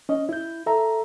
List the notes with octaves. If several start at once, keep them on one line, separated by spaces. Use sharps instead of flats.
C#4 D#5
E4 G6
A4 E5 A#5